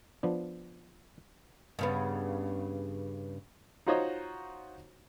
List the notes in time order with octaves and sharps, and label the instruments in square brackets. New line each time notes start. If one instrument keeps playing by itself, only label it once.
[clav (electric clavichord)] F3 B3 D4
[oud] G2 C#3 B3
[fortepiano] D#4 F4 F#4 C5 C#5 D#5